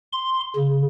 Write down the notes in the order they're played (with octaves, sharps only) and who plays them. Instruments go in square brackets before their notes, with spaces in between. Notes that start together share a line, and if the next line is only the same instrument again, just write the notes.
[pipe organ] C6
C#3